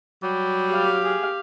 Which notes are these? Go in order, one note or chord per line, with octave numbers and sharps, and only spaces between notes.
F#3 G3
G4 F5
G#4